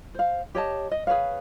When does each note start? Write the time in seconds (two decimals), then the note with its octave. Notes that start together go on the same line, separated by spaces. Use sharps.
0.14 C5 F5
0.55 G4 C#5 D#5 A5
0.91 D#5
1.07 G#4 B4 C#5 F5